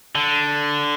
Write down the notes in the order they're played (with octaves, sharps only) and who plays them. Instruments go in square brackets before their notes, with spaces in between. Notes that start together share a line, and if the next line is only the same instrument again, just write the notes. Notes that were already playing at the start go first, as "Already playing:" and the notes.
[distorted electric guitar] D3